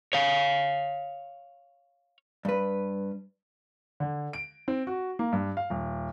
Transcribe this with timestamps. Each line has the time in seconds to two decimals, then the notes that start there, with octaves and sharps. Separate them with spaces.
0.13 C#5 F5
2.45 G2 B4
4.00 D3
4.33 D7
4.68 C4
4.87 F#4
5.19 A#3
5.32 G2
5.57 F5
5.70 D#1